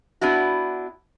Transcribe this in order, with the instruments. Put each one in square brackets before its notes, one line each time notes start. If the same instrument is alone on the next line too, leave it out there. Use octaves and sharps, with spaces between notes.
[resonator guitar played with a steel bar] B3 D4 E4 F#4